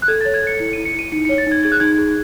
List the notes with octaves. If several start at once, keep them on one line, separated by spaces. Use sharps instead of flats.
F#6
A4 G#6
C#5 A6
G#6
A4 C#7
E4 C#7
E4 D#7
C#7
E4 D#7
D#4 C#7
C#5 C#7
A6
D#4 G#6
G#4 G#6
F#6
D#4 G#6
G#4